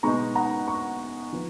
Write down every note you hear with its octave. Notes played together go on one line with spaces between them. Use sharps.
B2 G#3 B3 D#4 A#5 C#6
F#5 A#5
A#5 C#6
F3 B3